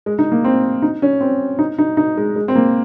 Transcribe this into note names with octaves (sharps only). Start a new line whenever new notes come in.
G#3
D#4
A#3
C4
D#4
C#4
C4
D#4
D#4
D#4
G#3
G#3
C4
A#3